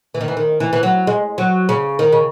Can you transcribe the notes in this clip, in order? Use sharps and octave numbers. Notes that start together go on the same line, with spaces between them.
E3
D#3
E3
D#3
E3
E3
F#3
G#3
F#3
C#3
D#3
C#3